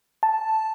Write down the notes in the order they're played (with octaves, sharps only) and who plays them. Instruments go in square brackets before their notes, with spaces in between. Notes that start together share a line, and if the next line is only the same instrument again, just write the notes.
[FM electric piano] A5